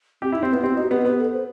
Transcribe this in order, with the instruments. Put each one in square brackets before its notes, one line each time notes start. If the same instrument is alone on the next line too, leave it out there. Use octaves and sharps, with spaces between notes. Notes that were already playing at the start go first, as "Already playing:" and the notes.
[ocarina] C4 [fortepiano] G4
[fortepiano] E4
[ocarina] D#4
[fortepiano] C4
[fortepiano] B3 [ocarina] E4
[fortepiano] C4 [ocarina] G4
[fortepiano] D#4 [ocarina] F#4
[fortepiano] B3 [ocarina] G4
[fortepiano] B3 [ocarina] B4
[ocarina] A4
C5